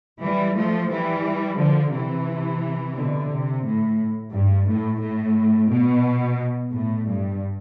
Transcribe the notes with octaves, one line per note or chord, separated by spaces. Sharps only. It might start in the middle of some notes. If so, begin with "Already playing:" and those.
E3 G3
F3 A3
E3 G3
D3 F3
C3 E3
B2 D3
C3
A2
G2
A2
A2
B2
A2
G2